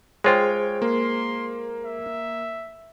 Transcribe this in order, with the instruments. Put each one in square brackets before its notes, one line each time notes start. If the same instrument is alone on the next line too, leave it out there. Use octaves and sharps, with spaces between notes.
[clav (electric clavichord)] G#3 F4 [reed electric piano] G#4 C5 [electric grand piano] C#5 G5
[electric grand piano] A#3 [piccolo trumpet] C6
[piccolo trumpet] E5